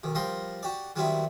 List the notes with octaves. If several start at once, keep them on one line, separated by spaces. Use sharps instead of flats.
B1 D#3
F3 G3 A#4 D#5 G5 C6
F#4 G4 D5
D#3 F#3 G3 B3 C4 E4